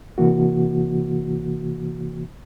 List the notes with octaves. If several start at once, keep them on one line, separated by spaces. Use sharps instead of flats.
C3 E3 A#3 F#4